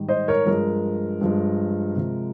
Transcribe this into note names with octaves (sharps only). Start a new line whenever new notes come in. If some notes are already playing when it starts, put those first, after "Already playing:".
Already playing: G#2 D#3 G3
C5 D#5
A#4 C#5
G2 F3 G#3 A#4
G2 F3 G#3
C3 F3 G#3